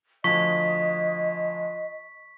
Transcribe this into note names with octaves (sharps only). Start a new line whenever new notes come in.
D2 F3 D#5 C#6 B6